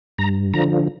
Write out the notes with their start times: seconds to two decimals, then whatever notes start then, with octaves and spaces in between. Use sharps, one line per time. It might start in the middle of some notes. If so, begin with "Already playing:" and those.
0.18 G2 A#5
0.54 D3 F3 A#5